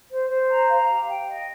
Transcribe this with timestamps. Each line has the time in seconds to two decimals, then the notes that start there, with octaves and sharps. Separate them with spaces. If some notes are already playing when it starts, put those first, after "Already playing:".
0.10 C5
0.29 C5
0.49 A#5
0.69 F5
0.88 G4
1.09 G5
1.27 D#5